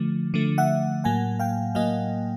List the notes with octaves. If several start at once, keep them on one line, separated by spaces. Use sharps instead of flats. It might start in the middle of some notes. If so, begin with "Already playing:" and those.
Already playing: D3 F3 A3
D3 F3 A3
E5 F#5
A2 F#3 A#3 F#5 G#5
F5 G5
A2 F#3 A#3 D#5 F5